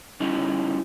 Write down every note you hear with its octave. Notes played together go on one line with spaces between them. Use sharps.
G3 C#4 D#4 E4 G#4